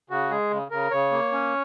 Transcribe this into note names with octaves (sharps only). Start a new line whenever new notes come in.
C#3 F#4
G#3 G#4
C#3
C#3 A#4
C#3 C#5
A#3
C#4